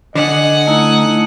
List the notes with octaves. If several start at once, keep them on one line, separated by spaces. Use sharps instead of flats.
D3 D#5 F#5 G#5
A3 D#4 E4 D#6